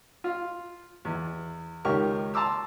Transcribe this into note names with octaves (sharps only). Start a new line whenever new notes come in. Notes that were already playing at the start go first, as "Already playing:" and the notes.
F4
E2
C#2 D#3 G4 A#4 C#6
A5 A#5 C6 D6 E6